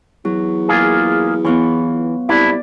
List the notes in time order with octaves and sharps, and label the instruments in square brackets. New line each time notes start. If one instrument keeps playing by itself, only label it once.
[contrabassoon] E2 [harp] F#3
[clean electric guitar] A#3 F4 G#4
[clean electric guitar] E3 [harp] B3 F4 C#5
[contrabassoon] C2 [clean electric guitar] D4 E4 [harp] D5